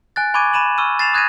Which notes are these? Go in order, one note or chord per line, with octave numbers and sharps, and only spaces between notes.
G#5 F#6 A6
G#5 B5 C#6 D6 G#6 D#7
B5 D#7 E7 F#7
C#6 E6 F6 D#7
A6 C7 E7 F7
D#6 F#6 G#6 A#6 D#7